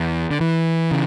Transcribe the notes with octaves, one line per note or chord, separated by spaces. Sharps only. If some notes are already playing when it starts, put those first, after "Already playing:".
Already playing: E2
D3
E3
C#3